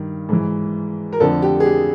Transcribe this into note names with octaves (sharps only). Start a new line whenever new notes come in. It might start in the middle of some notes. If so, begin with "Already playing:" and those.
Already playing: G2 D#3
G#2 E3
A#4
F2 D3 F3 A4
G4
G#4
G4